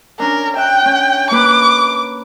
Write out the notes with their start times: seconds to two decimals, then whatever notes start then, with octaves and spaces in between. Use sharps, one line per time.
0.20 C#4 D4 A#4
0.56 E5 G5 F#6
0.85 C#4
1.31 A#3 B4 D6 F#6